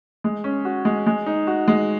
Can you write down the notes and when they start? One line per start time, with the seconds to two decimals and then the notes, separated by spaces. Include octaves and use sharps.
0.24 G#3
0.44 C#4
0.65 F#4
0.85 G#3
1.07 G#3
1.26 D#4
1.47 F#4
1.68 G#3